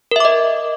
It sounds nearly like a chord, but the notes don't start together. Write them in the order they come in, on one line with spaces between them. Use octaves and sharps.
A#4 E5 D6 D#5